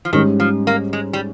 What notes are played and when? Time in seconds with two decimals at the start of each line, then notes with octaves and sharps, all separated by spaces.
0.05 F3
0.13 G#2 D#3 G3 C#4
0.40 F3
0.67 A#3
0.93 G#3
1.13 G3